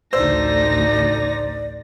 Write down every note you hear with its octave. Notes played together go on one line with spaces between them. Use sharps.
A1 D2 D3 D#4 C5 D5 E6 A#6